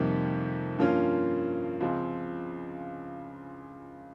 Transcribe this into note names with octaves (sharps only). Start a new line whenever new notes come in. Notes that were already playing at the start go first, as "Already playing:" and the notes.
Already playing: F2 C3 D#3 G3 A#3
G2 F3 A#3 C#4 F4
C#2 C#3 F3 C4